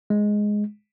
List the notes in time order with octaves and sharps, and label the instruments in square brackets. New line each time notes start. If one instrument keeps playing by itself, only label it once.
[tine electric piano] G#3